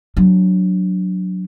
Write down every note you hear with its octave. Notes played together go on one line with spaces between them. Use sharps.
F#3 D4